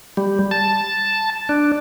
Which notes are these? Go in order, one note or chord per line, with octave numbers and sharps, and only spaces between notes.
G3
A5
D4